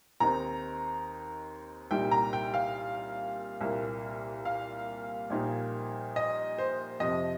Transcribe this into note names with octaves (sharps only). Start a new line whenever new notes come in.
D#2 D#3 C4 D#4 A#5
C2 A#2 G3 D#4 G5
A#5
G5
F5
C2 A#2 A#3
F5
A#1 A#2 G3 D#4
D#5
C5
F2 C3 F3 D#5